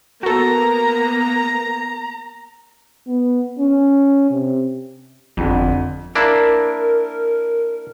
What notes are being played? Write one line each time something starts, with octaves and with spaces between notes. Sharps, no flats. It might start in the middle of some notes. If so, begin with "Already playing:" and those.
A#3 B3 F#4 A4 A#5
B3
C#4
C3
G1 F2 D3
A#3 D4 E4 A#4